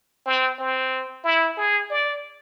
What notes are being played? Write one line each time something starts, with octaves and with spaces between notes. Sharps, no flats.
C4
C4
E4
G#4
D5